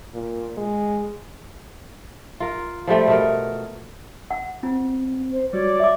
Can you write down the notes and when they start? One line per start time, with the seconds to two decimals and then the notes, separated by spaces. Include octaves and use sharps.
0.14 A#2
0.57 G#3
2.40 F4 A#4
2.87 F3 G3 A3 C4
3.08 B2 A3 A#4
4.30 F#5
4.63 C4 F4
5.32 C5
5.53 G3 F#4 C#5 D5
5.80 E5 D6